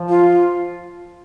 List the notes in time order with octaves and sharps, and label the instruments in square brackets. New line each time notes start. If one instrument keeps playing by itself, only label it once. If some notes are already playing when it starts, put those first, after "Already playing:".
Already playing: [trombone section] F3
[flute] F4